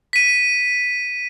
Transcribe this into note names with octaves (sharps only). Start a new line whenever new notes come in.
B6 D#7